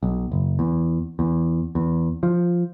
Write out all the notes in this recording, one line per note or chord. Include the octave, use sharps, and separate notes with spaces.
B1
F#1
E2
E2
E2
F3